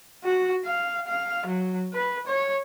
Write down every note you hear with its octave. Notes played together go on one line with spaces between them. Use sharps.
F#4
F5
F5
F#3
B4
C#5